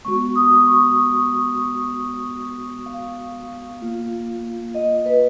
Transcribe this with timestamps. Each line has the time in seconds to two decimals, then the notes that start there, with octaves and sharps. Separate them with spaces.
0.05 G#3 B3 F#4 C#6
0.36 D#6
0.67 C#6
2.86 F5
3.81 A#3 F4
4.75 D#5
5.06 B4